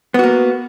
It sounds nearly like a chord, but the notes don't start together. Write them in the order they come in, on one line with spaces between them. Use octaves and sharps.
B3 F#4 A#3